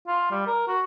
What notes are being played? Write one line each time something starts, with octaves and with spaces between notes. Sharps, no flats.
F4
G3
A#4
F#4